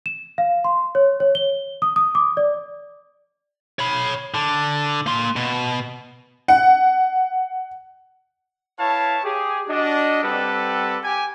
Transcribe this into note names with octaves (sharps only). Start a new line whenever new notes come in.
E7
F5
C6
C#5
C#5
G7
D#6
D#6
D6
D5
C#5 B5
D3
A#3 C6
B2
F#5
E4 B4 C#5 F5 A5
G4 G#4
D4 F#4 D#5
G3 C4 G4 A4 B4 F#5
G4 G#5